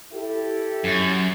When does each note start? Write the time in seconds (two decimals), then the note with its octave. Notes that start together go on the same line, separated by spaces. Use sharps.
0.13 E4 G4 A4
0.84 F#2